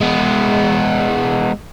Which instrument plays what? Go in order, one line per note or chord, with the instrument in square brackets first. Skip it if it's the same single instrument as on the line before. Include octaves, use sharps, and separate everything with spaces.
[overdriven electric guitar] G#3 B3